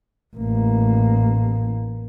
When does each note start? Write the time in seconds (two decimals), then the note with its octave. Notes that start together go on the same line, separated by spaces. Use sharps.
0.36 A1 A#3